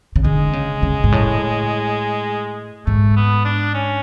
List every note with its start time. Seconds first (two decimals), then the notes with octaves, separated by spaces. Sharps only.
0.16 C#3
0.24 D3 G#3
0.53 C#3
0.83 C#3
1.04 G#2
1.12 A2
2.86 G#2 A3
3.16 B3
3.45 D4
3.74 C#4